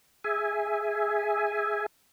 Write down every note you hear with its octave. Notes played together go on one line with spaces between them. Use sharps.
G#4 E5 G#5